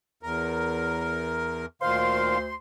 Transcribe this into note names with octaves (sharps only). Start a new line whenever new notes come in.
E2 A#4
D2 A#2 D#3 C5 F5 C6